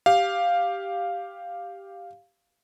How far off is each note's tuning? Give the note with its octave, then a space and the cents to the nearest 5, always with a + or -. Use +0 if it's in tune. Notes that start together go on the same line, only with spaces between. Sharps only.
G4 +0 F5 +0